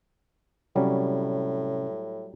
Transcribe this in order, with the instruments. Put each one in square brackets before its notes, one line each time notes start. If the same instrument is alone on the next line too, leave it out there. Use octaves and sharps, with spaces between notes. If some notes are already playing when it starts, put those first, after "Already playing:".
[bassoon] A2 [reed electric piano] C3 C#4 [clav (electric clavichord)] F#3 G3